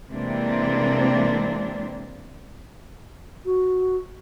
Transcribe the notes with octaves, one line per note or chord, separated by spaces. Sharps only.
C3 E3 G#3 A#3 C4 D4
F#4